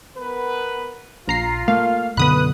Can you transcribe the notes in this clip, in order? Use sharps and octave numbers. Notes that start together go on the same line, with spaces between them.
B3 A#4 B4
A#1 F4 A#5 C7
A3 A#3 F5
B1 F#2 D3 B3 B4 B5 D#6 F#6